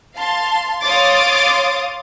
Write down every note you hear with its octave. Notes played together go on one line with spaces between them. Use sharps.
F5 A5 C6
C#5 F5 C6 D6 D#6 A6